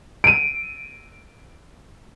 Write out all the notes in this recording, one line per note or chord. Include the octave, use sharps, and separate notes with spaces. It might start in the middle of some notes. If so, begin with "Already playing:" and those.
D7 D#7